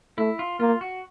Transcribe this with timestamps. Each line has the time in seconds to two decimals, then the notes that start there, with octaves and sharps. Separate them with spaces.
0.18 A3 E4
0.39 F4
0.60 A#3 F4
0.81 F#4